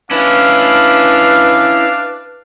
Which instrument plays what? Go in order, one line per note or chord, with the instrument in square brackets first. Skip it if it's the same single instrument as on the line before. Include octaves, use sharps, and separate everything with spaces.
[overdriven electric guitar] C#4 E4 [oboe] D4 [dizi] B4 [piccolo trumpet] F5